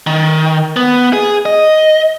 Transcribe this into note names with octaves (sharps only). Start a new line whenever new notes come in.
D#3
B3
G#4
D#5